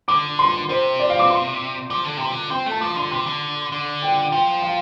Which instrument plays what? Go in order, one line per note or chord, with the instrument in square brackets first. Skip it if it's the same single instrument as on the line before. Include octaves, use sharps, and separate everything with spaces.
[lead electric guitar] D3 [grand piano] D6
[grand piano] C6
[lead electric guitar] C3 [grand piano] C5
[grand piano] D5
F5
D6
C6
[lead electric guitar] F3 [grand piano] D6
[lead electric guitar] D3
[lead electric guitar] C3 [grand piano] C6
[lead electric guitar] D3
[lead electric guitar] C4 [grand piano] C6
[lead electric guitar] A3
[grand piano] A5
[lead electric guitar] F3 [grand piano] D6
[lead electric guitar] D3 [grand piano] C6
[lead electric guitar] C3 [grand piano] C6
[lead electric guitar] D3
D3
[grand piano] G5
[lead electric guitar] F3 [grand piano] G5
[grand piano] F5